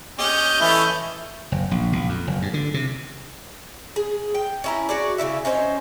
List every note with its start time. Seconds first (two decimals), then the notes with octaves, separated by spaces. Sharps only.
0.19 C#4 G4 D#5 G6
0.61 E3 A3 C#4 E4
1.52 F#1
1.71 A#1
1.92 A#1
2.09 F2
2.27 F#1
2.42 G2
2.54 D3
2.74 C3
3.96 G#4
4.35 G5
4.64 C#4 E4 A#5
4.89 F#4 G#4 D5
5.18 C#3 E3 E4 E5
5.45 C#4 D#4 C5 C#5